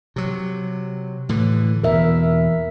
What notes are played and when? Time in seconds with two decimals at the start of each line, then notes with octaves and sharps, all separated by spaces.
0.16 C3 F#3
1.29 A2 D3 E3
1.83 E2 B2 A#4 E5